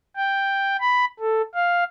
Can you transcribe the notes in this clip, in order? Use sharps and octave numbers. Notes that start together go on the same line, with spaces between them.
G5
B5
A4
F5